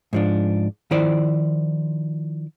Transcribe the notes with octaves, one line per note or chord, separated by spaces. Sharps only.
G#2 F3 D4
D#3 F3 E4 C5 D5